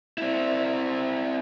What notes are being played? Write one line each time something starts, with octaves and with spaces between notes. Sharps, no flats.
C4 E4